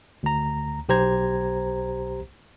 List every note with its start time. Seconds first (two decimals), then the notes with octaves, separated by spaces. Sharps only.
0.23 D2 A#5
0.89 B1 G4 C5 A#5 G#6